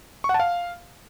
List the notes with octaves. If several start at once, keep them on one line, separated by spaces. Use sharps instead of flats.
C#6
F#5
A5
F5